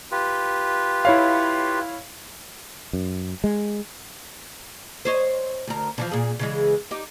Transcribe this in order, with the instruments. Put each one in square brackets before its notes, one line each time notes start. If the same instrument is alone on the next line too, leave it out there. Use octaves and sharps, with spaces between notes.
[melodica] F4 G4 B4
[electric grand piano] E4 C#5 F5
[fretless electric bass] F#2
G#3
[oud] C5 C#5 D#5
D2 A#4
D3 E3 F3
A#2 G#4
C#3 E3 G#3
D#4 G4